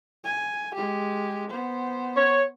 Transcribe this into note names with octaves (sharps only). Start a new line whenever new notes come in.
G#5
G#3 G4
B3 C5
C#5